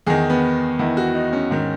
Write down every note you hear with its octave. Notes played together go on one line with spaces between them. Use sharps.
E2 D#3 G#4
B3
E2 D#3 E4
F#4
D#4
C#4
G#2 D#3